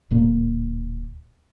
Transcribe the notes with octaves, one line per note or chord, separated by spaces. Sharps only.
D1 A#2 A#3